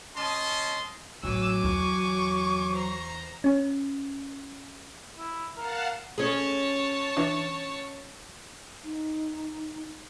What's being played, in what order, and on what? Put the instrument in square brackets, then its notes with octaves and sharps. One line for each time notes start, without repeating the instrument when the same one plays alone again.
[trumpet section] C#4 D#5 A5 C6
[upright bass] A1 [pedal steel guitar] F#3 [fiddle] G#5 D6 [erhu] E6
[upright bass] E2 [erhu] C#6
[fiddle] C5 A#5
[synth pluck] C#4
[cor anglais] E4
[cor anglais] A#4 [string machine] F5 F#5 A5
[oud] C#4 G#4 [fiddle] C#5 A5
[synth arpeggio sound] E3 D4
[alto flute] D#4